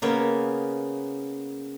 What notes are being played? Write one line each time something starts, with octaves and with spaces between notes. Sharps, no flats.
C#3 A#3 B3 C#4